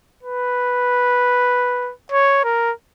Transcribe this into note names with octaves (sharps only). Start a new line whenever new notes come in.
B4
C#5
A#4